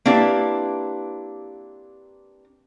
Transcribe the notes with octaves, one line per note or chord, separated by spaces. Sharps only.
A#3 C4 D4 E4 G4 B4